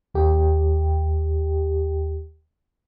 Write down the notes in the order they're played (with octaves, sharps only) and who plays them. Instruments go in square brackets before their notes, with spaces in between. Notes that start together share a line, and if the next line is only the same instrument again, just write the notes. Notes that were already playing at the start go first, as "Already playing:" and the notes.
[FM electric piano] D#2 G4